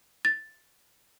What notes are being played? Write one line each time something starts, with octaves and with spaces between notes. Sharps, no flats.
A6